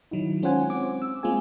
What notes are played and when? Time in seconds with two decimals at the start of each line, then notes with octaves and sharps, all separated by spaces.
0.11 D#3 F#3 D#4 E4
0.42 G#3 C#4 F4 C5 F#5 G#5
0.70 C4 D6
1.02 E6
1.23 G#3 A#3 C4 F4 G#4 G#5